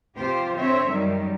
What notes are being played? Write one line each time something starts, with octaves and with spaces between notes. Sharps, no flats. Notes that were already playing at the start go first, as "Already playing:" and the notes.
C3 F3 F4 G4 C5
D3 C4 C5 C#5 E5
F#2 D#3 F#3 G3